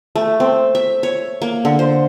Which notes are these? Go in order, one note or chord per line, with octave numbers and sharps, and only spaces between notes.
A3
C4
E5
C#5
A#3
D3
C5